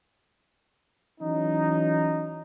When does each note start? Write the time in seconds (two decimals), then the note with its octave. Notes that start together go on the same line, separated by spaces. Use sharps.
1.20 E3 F#3 C#4 D#4